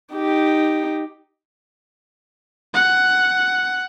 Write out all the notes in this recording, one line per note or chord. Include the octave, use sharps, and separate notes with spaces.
D#4 G4
F#5